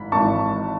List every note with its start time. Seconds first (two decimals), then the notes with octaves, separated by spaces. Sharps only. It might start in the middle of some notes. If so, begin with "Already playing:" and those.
Already playing: G#1 G#2 E3 B5
0.12 G#1 G#2 E3 A5 C#6